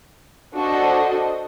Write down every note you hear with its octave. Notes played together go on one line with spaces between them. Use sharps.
D4 F#4 A4 C5 D#5